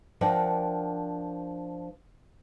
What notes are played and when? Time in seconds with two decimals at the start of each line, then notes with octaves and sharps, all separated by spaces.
0.21 F3 D4 A#4 D5 F#5 G5